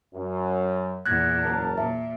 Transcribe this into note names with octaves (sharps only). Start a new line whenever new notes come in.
F#2
E2 A#2 F#6 G#6 A#6
F#1 A#4 A5
A#2 E5